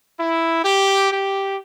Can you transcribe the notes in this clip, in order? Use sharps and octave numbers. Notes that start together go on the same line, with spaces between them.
E4
G4
G4